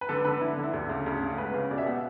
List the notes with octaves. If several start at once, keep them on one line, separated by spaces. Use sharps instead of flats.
B4
D3 A4
D3 B4
D3 E4
D3
E4
D2
C#3
D2
C#3
C#2 B4
C#3
B2 D5
E5
B2 F#5